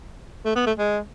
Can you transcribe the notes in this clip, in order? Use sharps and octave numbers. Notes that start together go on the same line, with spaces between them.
A3
B3
A3
G#3